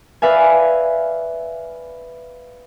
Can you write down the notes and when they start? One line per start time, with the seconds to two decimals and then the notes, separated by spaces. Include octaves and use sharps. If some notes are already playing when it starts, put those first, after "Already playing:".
0.22 B4 D5 E5 F5 G#5